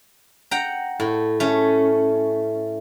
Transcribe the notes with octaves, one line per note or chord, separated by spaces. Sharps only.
F#5 G5 A#5
A2
A3 C#4